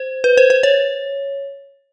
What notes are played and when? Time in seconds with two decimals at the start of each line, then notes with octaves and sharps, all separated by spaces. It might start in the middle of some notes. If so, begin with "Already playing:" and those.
Already playing: C5
0.24 B4
0.37 C5
0.50 C5
0.63 C#5